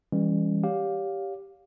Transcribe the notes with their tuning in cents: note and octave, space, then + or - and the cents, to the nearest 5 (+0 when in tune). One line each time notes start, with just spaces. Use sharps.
E3 +0 G3 +35 C#4 +0
G4 +0 C#5 +30 F5 +15